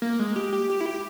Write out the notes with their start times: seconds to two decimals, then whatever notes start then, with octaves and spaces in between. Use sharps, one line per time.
0.02 A#3
0.19 G#3
0.36 G4
0.53 G4
0.70 G4
0.81 E4
0.86 G4